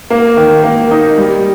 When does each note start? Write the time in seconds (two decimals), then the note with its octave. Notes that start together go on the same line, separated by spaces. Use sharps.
0.10 A#3
0.37 D#3
0.63 A#3
0.91 D#4
1.18 G3